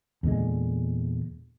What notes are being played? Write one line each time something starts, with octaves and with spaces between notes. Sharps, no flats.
E2 A#2 D3 G#3